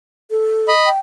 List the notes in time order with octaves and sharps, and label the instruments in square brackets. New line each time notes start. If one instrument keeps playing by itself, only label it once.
[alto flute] A4
[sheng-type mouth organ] D#5 B5
[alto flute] G5